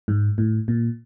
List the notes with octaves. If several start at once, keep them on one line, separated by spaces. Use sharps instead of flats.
G#2
A2
A#2